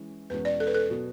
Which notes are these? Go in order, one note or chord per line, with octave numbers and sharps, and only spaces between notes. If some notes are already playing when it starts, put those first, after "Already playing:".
Already playing: E3 G#3 C#4
E2 B2 G#3 C#4 B4
D5
A4
B4
A4
B2 F#3 B3